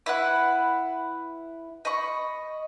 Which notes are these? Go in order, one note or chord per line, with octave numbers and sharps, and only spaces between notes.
E4 B4 F#5
D#5 B5 C#6